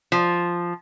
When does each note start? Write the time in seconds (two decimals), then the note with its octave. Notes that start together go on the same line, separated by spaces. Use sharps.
0.12 F3